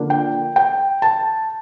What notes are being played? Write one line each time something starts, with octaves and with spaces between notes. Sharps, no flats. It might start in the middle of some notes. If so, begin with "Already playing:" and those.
Already playing: D3 F3 A#3 D4
G5
G5
A5